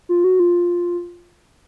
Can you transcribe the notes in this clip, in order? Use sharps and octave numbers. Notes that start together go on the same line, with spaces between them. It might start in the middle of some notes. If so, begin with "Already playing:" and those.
F4
F#4
F4